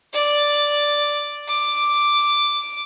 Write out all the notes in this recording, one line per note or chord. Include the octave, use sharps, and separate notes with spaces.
D5
D6